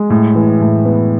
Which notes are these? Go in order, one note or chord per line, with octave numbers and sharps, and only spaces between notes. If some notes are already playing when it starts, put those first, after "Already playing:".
Already playing: G#3
A2
E3
A2
B3